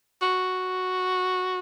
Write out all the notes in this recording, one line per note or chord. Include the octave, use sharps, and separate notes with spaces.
F#4